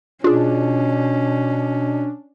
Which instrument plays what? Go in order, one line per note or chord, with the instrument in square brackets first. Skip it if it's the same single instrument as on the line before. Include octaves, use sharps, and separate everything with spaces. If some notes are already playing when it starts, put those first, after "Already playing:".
[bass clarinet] B2 [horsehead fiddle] C#4 [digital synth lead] D4 [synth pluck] F4 G#4